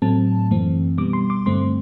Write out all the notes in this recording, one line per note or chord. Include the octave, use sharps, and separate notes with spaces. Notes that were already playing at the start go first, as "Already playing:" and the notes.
A2 F#3 A3 C4 A5
F#2 E3 A3 C4
B2 G3 B3 D6
C6
D6
G2 D3 A3 C4 C6